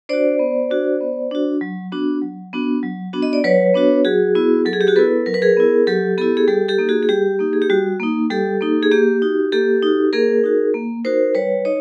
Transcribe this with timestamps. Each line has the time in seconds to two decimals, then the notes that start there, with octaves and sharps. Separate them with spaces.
0.09 D4 F#4 C5 D5
0.39 B3
0.71 D4 F#4
1.00 B3
1.31 D4 F#4
1.61 F#3
1.92 B3 D4 F#4
2.22 F#3
2.53 B3 D4 F#4
2.83 F#3
3.13 B3 D4 F#4
3.23 D#5
3.33 D5
3.44 F#3 B4 C#5
3.74 B3 D4 F#4
4.05 F#3 F#4 G#4
4.35 B3 E4
4.65 F#3 A4
4.73 G#4
4.81 G4
4.87 F#4 G#4
4.96 B3 E4 A4 B4
5.26 F#3 A#4
5.34 B4
5.42 G#4 A#4
5.57 B3 E4
5.87 F#3 G4 A4
6.18 B3 E4 G4 A4
6.37 G#4
6.48 G3 G4 A4
6.68 G4 A4
6.78 A#3 D#4
6.89 F#4 G#4
7.03 G#4
7.09 G3 G4
7.39 A#3 D#4
7.53 G#4
7.62 G4
7.70 G3 F#4
8.00 A#3 D#4
8.30 G3 G4 A4
8.61 A#3 D#4
8.83 G#4
8.91 A#3 G4
9.22 D#4 F#4
9.52 A#3 G4 A4
9.83 D#4 F#4
10.13 A#3 G#4 A#4
10.44 D#4 F#4
10.74 A#3
11.04 D#4 F#4 A#4 C5
11.35 G3 B4 C#5
11.65 D#4 C#5 D#5